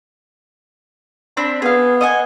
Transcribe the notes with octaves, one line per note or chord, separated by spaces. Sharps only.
C4 D4 B5
B3 G#4 F5
D#5 F#5 G#5